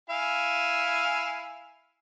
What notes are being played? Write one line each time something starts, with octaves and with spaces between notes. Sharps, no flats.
E4 F5 G#5